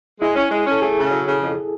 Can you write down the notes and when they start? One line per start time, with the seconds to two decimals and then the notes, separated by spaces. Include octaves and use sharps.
0.21 G#3 E4
0.36 C#4
0.51 G#3
0.67 C#4 A4
0.82 A3 G#4
0.97 C#3
1.11 F#3
1.26 C#3
1.41 F2